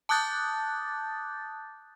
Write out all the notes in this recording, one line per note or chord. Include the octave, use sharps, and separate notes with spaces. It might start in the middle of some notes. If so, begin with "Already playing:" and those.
A5 D6 D#6 F#6 G6 A6